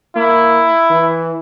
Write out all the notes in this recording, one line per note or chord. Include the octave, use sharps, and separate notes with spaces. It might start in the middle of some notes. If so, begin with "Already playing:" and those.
A#3 E4
E3